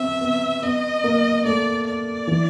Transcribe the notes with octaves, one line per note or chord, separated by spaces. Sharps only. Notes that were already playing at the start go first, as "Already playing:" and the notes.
Already playing: B3 C4 E5
B3
B3 D#5
A#3
A3 D5
D5
E3